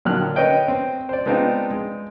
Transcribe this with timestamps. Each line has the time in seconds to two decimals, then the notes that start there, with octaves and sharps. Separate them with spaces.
0.05 A#2 D3 D#3 F#3 F6 F#6
0.36 B4 C#5 D#5 G5
0.68 C4
1.09 C5 D5
1.26 G#3 B3 C4 D4 D#4 F4
1.71 G#3